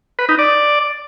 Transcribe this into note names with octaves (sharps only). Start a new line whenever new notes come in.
B4
D#4
D5